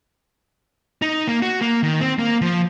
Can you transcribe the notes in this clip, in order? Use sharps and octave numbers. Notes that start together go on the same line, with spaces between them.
D#4
A#3
F#4
A#3
D#3
C4
A#3
F3